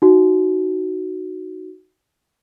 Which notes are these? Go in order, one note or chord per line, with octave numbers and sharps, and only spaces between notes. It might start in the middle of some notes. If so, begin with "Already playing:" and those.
D#4 F#4